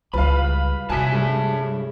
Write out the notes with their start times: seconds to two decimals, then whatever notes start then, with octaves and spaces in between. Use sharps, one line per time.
0.13 C#2 G3 F4 B4 F5 B5
0.90 C3 F#4 C#5 E5 G#5 A5 B6
1.12 G2 G#3 A3 C#4